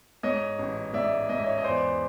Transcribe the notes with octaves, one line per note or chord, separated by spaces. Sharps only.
G#2 C#5 D#5
A1
G#2 D5 E5
G#2 D#5
E5
C#5 D#5
D#5
E2 C5 D5